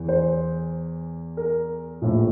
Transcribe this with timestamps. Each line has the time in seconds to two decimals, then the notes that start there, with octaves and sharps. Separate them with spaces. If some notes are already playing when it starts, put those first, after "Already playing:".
Already playing: E2 E3
0.08 C5
1.37 A#4
2.02 A#1 A2 F3